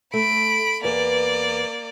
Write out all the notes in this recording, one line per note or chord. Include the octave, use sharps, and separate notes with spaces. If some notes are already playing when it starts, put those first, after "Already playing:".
A3 B5 D7
E2 A#3 B4 D5